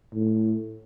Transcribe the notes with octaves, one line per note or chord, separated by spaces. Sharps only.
A2